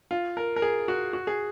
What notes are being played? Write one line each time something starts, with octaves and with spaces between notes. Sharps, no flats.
F4
A#4
A#4
G#4
F#4
F#4
G#4